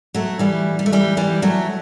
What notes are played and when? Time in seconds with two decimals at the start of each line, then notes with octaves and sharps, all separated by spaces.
0.15 F#3 A3
0.39 E3 G3
0.79 G3
0.86 A3
0.92 E3 G3
1.17 E3 G3
1.42 F#3 A3